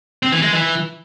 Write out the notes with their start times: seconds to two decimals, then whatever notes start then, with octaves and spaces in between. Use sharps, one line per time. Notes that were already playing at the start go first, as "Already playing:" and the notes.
0.23 C4
0.33 E3
0.42 G#3
0.52 E3